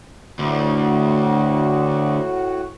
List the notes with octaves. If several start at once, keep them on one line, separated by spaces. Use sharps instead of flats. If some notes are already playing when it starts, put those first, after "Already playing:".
D2 A2 F#4